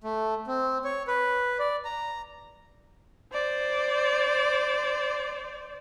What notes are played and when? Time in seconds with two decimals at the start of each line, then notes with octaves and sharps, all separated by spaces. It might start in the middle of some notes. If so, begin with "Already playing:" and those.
0.04 A3
0.47 C4
0.85 C#5
1.08 B4
1.59 D5
1.85 A#5
3.33 C5 D5